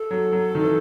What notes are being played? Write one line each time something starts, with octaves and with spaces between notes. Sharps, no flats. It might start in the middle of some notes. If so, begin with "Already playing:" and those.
Already playing: A4
F#3
F#3
D#3
E3